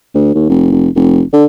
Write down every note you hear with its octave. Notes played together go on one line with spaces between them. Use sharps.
D2
D#2
F1
F1
F1
D3